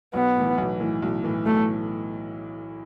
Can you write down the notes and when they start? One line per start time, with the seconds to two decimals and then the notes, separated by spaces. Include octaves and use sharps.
0.13 B1 B3
0.36 A2 E3
0.58 B1
0.80 A2 E3
1.02 B1
1.23 A2 E3
1.46 B1 A3